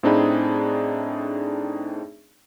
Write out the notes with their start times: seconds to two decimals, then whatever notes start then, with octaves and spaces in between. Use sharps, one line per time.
0.03 A2 C4 D4 D#4 G#4 B5